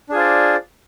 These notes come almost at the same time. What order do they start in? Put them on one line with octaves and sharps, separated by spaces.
D4 G#4 F4 C5 D5